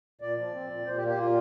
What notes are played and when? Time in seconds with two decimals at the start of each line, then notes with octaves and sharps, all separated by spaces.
0.21 A#2 D5
0.37 F3
0.53 C4
0.70 A#2
0.86 A#2 C5
0.97 G4
1.02 A#3
1.08 G4
1.17 A#2 F4